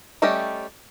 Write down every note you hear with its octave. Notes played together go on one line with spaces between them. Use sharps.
G3 A3 C#4 G4 D#5